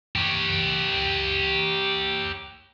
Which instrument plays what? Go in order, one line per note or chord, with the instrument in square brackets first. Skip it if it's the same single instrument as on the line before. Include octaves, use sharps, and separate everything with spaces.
[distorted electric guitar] G4 C#5